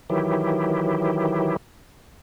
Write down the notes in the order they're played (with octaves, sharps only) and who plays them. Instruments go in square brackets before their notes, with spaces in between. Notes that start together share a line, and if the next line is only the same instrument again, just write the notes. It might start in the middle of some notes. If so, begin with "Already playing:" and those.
[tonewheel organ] D#3 E3 F#3 E4 G4